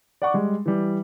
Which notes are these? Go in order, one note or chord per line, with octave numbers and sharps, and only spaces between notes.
D5 F#5 C#6 D6
G3 G#3
E3 G3